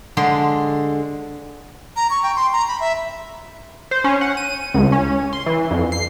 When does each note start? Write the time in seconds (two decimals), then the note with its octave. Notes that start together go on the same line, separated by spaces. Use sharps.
0.17 D3 G#3 D5 C6
1.96 A#5
2.10 C#6
2.23 G5
2.36 C6
2.53 A#5
2.68 B5
2.80 E5
3.91 C5
4.04 C#4
4.21 F#5
4.37 D#7
4.74 C#2
4.92 C#4
5.33 C6
5.46 E3
5.71 F2
5.92 C7